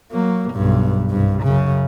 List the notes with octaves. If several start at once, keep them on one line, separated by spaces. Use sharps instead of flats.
F#3 A#3
B1 G2
C2 G2
F#2 C#3